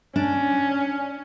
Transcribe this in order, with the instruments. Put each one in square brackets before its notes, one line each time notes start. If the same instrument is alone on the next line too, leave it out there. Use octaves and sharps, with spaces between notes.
[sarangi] C#4 [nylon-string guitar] D4